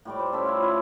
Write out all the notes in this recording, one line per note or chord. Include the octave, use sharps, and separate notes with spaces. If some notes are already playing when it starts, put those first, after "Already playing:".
A2 G3 D6
C5
C#4 A4 E5 D6
E4 F4
E4